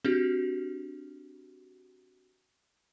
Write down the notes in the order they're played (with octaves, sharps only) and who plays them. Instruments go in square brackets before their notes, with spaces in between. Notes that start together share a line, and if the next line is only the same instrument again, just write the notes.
[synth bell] C4 D4 F#4 G4